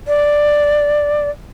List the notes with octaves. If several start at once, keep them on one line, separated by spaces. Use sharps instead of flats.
D5